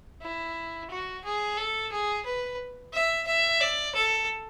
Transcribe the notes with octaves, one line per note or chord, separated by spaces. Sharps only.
E4
F#4
G#4
A4
G#4
B4
E5
E5
D5
A4